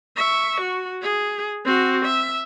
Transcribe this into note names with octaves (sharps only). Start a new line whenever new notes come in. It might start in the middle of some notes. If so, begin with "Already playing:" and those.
E5 C#6
F#4
G#4
C4 F#4
E5